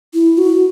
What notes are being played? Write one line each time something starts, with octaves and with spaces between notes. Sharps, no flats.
E4
F#4